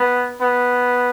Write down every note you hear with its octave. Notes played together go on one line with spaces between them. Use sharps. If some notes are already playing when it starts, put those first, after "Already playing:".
Already playing: B3
B3